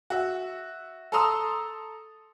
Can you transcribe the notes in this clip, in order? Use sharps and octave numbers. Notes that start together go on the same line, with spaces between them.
F#4 E5
A4 A5 A#5 C6 D#6 E6